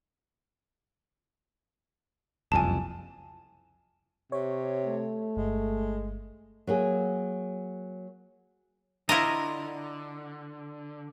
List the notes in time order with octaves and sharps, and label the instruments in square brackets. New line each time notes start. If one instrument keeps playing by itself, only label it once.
[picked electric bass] F#1 C2 F2 [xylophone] G#5 A5
[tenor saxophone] C3 [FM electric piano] C#5
[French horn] A3
[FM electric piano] G1 [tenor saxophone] G#3
[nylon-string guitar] F#3 A#3 G#4
[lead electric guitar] D3 [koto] E4 F4 D#5 [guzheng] A#5